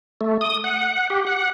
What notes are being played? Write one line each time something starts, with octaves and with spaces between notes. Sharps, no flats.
A3
D#6
F#5
G4
F#5